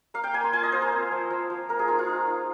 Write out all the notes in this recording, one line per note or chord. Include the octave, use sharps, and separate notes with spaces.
A#3 F5
G5
A#3 G#5
C6
F4 G#5
D#5
F4 C5
A#4
C4
F3
F3
F3
A#3 A#4
G#4
D#4 F4
F4
D#4
D#4